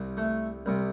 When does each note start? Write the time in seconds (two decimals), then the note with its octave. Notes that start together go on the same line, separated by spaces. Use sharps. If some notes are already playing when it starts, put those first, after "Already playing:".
Already playing: C2 C3
0.17 A3
0.66 C2 C3